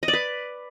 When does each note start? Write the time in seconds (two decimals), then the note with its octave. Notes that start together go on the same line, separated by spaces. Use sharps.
0.03 D#5
0.08 D5
0.13 B4